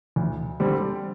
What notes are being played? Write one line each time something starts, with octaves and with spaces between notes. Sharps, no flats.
D2
D3 G3 C4